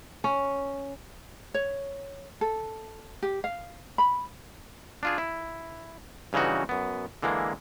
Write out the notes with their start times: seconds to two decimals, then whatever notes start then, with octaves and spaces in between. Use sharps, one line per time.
0.24 C#4
1.54 C#5
2.41 A4
3.23 G4
3.44 F5
3.98 B5
5.03 D4 F4 G#4
5.18 E4
6.33 G2 C#3 E3 D#4 F#4
6.69 F#2 B3
7.23 D3 E3 G#3 A#3